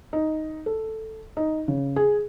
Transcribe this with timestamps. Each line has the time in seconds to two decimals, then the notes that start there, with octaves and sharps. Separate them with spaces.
0.13 D#4
0.66 A4
1.37 D#4
1.68 C#3
1.96 G#4